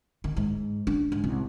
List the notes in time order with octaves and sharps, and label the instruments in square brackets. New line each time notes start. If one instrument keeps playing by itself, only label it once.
[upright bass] D#3
G#2
D4
G#2
C2